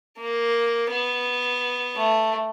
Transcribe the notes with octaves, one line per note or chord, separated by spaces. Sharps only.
A#3
B3
A3